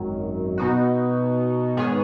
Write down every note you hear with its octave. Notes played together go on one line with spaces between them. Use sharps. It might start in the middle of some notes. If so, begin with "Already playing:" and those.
Already playing: G#1 F#2 D#3 F#3
B2 B3 D#4 F#4
G#2 D#3 B3 G#4 C#5